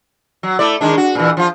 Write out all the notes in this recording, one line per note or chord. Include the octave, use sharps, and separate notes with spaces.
F#3
A3 E4 D5
D#3 G#3 D4
F#4
A#2 E3
F3 F4